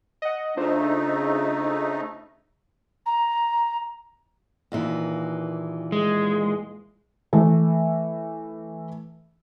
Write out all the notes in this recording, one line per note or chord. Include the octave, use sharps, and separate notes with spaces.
D#5 F#5
C#3 A3 D4 D#4 F4 C5
A#5
D#2 A#2 E3
G#3
E3 A3